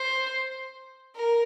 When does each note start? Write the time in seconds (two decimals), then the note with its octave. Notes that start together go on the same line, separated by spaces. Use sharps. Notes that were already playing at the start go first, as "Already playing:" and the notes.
Already playing: C5
1.14 A#4